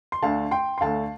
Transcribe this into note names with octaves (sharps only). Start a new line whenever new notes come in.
C6
D2 D3 A3 F5 A5
G5 C6
C6
D2 D3 A3 F5 A5